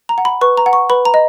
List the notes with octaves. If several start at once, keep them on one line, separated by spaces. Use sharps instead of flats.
A#5
F#5
B5
B4 C#6
A#5
F#5
C#6
B4 B5
A#5
D#5